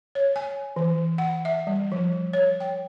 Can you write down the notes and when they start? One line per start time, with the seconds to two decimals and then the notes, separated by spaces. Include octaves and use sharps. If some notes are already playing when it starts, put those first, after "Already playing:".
0.15 C#5
0.36 G#5
0.76 E3
1.18 F#5
1.45 E5
1.67 G3
1.92 F3
2.33 C#5
2.60 G5